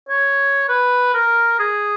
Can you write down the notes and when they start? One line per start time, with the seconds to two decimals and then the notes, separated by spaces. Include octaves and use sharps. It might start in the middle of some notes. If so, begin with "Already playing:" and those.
0.09 C#5
0.69 B4
1.14 A#4
1.59 G#4